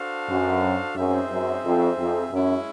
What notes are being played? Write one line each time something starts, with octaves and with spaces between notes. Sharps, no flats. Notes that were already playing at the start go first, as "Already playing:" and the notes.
Already playing: D4 F#4 A4 C5 F5
F#2
F#2 C4 D#4 G#4 C5 E5
F#2
F2
F2
F#2 G#3 C#4 E4